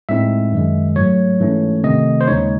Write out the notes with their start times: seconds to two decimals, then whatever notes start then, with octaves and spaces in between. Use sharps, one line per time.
0.09 A2 G#3 C4 D#4 E5
0.52 F#2 D#3 G#3
0.96 G#2 F#3 A3 C#5
1.40 G#2 E3 A3 C#4
1.84 C3 D#3 A3 C4 D#5
2.21 C5
2.28 D#2 C#3 G#3 D#4 C#5